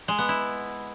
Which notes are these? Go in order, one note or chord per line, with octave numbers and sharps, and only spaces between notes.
G#3
B3
E4